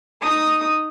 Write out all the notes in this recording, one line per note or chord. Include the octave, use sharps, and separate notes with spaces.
D#4 D#6